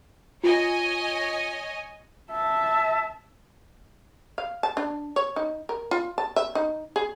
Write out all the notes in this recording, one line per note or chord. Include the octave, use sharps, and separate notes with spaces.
F4 C#5 D#5 G#5
E5 A5
F5
A5
D4
C#5
D#4
A#4
F4
A5
E5
D#4
G#4